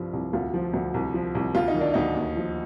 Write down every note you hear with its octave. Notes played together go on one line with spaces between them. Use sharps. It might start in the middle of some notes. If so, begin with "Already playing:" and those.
Already playing: C2 G2 F3
C2
D2 F4
F3
D2
C2
F3
C2
D2 F4
D#4
D#3
D4
D2 D#4
D#2
F3